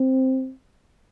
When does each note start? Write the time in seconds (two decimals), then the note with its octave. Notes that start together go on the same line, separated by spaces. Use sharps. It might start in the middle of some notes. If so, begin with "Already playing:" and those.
Already playing: C4